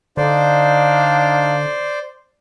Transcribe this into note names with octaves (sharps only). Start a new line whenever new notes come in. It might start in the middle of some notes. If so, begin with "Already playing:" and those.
D3 D4 D#4 C5 D5 F5